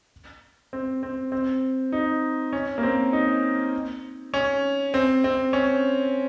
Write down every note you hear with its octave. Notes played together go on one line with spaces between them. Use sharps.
C4
C4
C4
D#4
C#4
A#3
C4
D#4
C#4
C4
C4
C#4